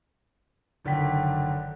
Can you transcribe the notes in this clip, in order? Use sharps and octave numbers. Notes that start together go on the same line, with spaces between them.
F#1 D3 D#3 B6